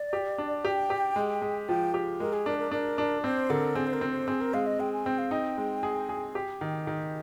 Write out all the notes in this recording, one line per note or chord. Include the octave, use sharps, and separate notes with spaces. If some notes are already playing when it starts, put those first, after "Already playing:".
Already playing: D5
G4
D4
G4 G5
G4
G#3
G#3
F3 G5
G4
G#3 A#4
G#4
D4 A#4
A#4
D4 A#4
D4
C4 C5
D3 A#4
C4 G#4
C5
A#4
C4
C5
C4 G#4
A#4
G#3 F5
D#5
G#3 G5
G#5
C4 G5
F5
D#4 G5
G#3
G#4
G#4
G4
D#3
D#3